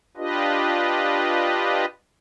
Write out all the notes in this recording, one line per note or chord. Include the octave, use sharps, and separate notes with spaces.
D4 F4 G4 B4 D#5